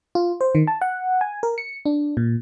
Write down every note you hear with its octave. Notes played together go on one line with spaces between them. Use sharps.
F4
C5
D#3
A5
F#5
G#5
A#4
C#7
D4
A#2